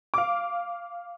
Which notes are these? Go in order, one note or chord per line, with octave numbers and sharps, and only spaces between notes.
F5 D6